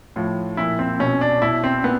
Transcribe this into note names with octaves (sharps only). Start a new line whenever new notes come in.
A2 F3
A#2 F3 E4
C4
B2 C#4
D4
B2 E4
C4
A#2 B3